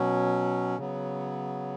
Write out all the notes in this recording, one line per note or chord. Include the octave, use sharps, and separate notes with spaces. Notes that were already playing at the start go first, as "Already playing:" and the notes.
Already playing: B2 F#3 C#4
C#3 F#3 B3